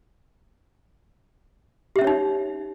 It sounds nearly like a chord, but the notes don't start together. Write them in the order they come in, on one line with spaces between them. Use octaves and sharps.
G4 E5 C#4 C#5 D#4